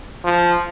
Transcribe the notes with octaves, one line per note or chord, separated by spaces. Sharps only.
F3